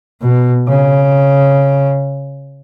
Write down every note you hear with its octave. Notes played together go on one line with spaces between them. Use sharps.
B2
C#3